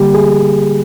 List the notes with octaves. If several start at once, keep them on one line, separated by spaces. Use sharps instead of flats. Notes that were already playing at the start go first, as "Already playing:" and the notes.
Already playing: D3 G3 A#3 G4
G#4